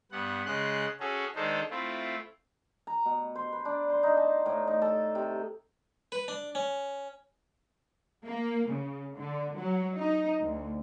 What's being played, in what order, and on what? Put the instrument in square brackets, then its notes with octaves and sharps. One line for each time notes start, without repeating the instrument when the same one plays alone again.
[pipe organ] G2 B3 F#5
C#3 G#3 C6 F#6
C#4 F#4 G#4 A4
D#3 G#3 D4 D#4 A4 C5
A3 C4 E4 F4
[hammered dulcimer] A#5
B2
C5
B4
D4
C5
D#4
A5
A2
D#4
A4
C3
[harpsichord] B4
D4
C#4
[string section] A#3
C#3
D3
F#3
D#4
D2